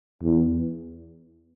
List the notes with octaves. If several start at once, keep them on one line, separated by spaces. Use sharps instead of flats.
E2